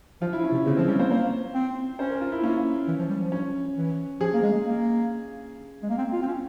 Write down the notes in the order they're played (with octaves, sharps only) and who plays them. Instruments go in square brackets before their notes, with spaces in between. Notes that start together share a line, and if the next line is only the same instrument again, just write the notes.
[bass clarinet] F3 [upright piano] F4
[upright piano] E4
C#4
[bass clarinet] C3
[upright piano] C#4
[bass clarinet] C#3 [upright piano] C4
[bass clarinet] F3 [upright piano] C4
[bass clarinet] G3 [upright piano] C#4
[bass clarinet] A#3 [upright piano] C5
[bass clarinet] A#3 [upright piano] C5
[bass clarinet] C4
[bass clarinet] C#4 [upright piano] C5
[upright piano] A#4
F4
E4
[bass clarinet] A#3 [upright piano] C#4
[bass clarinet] E3
F3
G3
F3
[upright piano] C#4
[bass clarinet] E3
[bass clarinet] F3 [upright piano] G#4
[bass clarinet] A#3
G#3
A#3
G#3
A#3
C4
F4
C4
C#4